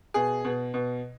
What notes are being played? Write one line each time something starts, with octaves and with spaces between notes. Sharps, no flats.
B2 G#4
B2
B2